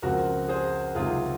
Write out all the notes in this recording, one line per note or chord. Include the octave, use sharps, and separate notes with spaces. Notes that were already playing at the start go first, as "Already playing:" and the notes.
C#2 C#3 F3 C4 F#4 A#4
G#4 C5
C#2 C3 D#3 F#3 F4 G#4